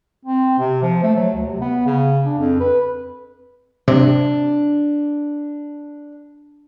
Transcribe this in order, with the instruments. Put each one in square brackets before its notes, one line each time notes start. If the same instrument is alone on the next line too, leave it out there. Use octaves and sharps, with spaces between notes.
[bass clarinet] C4
C3
F3
A3
F#3
D2
C3
B3
C#3
D4
F2
B4
[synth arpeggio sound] C3 [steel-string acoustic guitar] D4